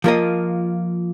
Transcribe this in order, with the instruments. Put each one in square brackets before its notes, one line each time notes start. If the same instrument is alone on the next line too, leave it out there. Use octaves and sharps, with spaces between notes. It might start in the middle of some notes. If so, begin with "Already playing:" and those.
[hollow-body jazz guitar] F3 A#3 F4 A#4 D#5